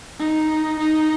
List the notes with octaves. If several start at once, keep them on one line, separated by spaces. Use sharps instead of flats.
D#4
D#4